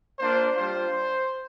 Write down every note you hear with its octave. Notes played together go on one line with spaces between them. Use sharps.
A#3 D4 F4 C5
G3 D4 F4 C5